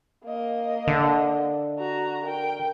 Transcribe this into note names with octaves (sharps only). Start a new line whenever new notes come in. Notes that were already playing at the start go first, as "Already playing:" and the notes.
A#3 D#5
D3
F#4 A#5
A#4 G5